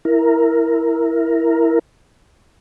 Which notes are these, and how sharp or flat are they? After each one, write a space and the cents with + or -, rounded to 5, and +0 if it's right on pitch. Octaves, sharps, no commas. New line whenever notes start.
E4 +5 A#4 +0